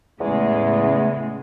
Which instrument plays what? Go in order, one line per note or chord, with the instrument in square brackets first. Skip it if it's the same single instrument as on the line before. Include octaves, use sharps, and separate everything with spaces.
[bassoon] E2 [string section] A2 C#3 G#3